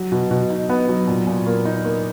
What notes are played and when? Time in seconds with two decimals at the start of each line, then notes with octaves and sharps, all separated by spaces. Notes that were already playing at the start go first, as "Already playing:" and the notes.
Already playing: F#3
0.12 B2
0.31 B2
0.50 D#4
0.69 B3
0.89 F#3
1.07 A#2
1.27 A#2
1.46 A#3
1.65 D#4
1.85 A#3